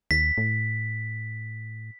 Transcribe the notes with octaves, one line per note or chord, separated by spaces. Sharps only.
D#2 B6
A2